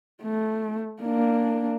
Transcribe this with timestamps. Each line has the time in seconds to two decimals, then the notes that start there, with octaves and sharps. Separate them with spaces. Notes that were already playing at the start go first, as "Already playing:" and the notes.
0.23 A3
1.02 A#3 D4